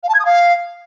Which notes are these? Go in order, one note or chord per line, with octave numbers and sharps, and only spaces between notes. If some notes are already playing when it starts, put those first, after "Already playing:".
F5
A5
G#6
D#6
F5